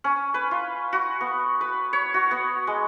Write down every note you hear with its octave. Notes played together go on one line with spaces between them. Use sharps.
C#4
B4
F4
F#4
B3
B4
C#5
F#4
B3
G#3